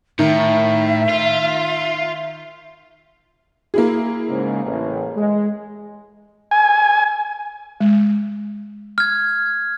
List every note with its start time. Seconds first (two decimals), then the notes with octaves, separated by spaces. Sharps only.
0.19 A2 D#3 E5
1.09 F4
3.74 A#3 E4 G#4
4.29 G#2 C#3
4.65 A1
5.16 G#3
6.51 G#5
7.80 G#3
8.98 F6 G#6